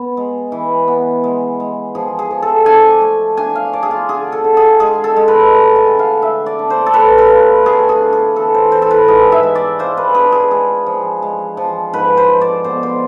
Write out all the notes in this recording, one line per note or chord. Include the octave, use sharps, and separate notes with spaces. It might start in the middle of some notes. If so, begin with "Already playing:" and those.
Already playing: B3
G#3
E3
B3
G#3
G#3
F3 G#4
G#4
F3
A4
D4 G#5
A3
D4 G#5
F5
D4 D5
G#4
F4
D3 G#4
A4
D3
G#4
G#3 G#4
A4
G#3
B4
A3
G#5
D3
F5
D3 E5
D5
D4
C5
A4
A3 B4
B4
F4
A3 G#4
G#4
D4
G#4
E3 A4
C5
E3 C5
A4
B4
G#2 G#4
E5
G#3
D5
F4 C5
B4
D4 G#4
G#4
G#3 G#4
F3
G#3
F3
G#2 B4
C5
F3
D5
B2 C5
C5